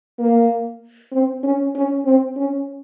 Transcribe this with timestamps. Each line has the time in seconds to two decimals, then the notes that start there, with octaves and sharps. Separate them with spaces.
0.19 A#3
1.12 C4
1.43 C#4
1.75 C#4
2.05 C4
2.37 C#4